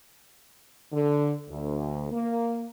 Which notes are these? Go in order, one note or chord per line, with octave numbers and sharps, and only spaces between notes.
D3
D2
A#3